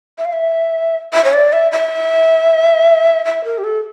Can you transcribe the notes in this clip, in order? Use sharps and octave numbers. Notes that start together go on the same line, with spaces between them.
E5
F5
E5
E5
C#5
D5
E5
E5
E5
A#4
G4
A4